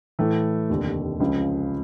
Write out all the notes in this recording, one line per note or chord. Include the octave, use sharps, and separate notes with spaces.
A2 E3 A3
F1 D#2 D3
C#2 C#3 F3